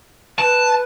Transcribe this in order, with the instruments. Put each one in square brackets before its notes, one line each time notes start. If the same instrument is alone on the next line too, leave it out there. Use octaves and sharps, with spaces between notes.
[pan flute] B4 [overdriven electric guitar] A5